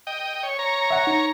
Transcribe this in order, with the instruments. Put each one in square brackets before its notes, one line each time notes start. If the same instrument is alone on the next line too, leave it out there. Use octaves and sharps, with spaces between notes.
[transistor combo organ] D#5 G5
C#5
C#5 A#5
[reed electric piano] E5 F#5
D#4